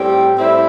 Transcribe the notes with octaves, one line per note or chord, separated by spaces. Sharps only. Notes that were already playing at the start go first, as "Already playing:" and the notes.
Already playing: A2 G3 C4 G4
A2 G3 C4 E4